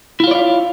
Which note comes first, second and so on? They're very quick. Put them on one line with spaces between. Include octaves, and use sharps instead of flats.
E4 F4 C#5 D5 F5